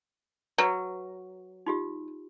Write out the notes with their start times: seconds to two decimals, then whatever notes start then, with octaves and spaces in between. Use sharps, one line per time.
0.58 F#3 B4
1.66 D#4 F4 G4